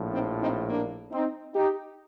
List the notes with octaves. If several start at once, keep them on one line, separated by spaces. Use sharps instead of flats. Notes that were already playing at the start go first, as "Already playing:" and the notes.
Already playing: A#1 A2 F3
C4 D#4
C4 D#4
A#3 D4
C4 D#4
D#4 G4